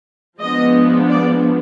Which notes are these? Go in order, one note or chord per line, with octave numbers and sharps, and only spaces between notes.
F3 G#3 B3 D4 D#5
D5